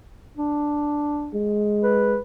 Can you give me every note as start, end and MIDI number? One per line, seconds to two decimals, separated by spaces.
0.37 1.34 62
1.34 2.17 56
1.83 2.21 71